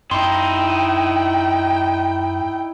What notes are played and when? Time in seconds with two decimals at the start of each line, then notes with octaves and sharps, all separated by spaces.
0.11 F#2 D#4 E4 G5 C6